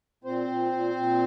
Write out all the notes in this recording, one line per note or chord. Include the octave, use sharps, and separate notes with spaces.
A#2 C4 C5
A#2
A#2
A#2